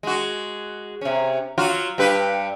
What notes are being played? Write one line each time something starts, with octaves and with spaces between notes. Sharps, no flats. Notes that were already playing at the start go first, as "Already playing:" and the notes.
G#3 F#4
C3 C#4
F#3 F4 F#4
G2 G4 B4